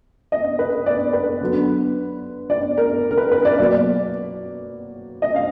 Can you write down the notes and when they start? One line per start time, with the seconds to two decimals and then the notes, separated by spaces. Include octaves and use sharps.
0.32 D#5
0.59 B4
0.86 D5
1.13 B4
1.41 D3 F#3 B3
2.50 D5
2.78 A#4
3.11 A#4
3.18 B4
3.32 B4
3.45 D5
3.58 B2 F#3 A#3 D5
5.22 D#5
5.36 F5